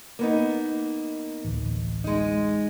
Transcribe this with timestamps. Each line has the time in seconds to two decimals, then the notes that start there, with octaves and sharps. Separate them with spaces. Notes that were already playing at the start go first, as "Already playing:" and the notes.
0.19 A#3 B3 D#4
1.45 A1 D2
2.04 G#3 D#4